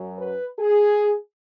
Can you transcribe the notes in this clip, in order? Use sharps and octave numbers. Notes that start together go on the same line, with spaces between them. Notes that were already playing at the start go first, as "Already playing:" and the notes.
Already playing: F#2 F#3
B4
G#4